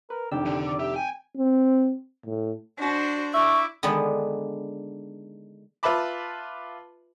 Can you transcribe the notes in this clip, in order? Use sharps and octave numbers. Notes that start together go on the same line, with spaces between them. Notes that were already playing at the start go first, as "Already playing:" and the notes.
A#4 B4
F1 D#3 D4 G4 E6
D3
D5
G4 E5
G5 G#5
C4
A2
D4 F#4 C5
E4 E5 C#6 D6
D3 D#3 G#3 B3 D4
F4 B4 E5 A5 B5 D6